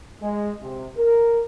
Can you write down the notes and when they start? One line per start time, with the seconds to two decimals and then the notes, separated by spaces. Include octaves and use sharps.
0.22 G#3
0.62 C3
0.98 A#4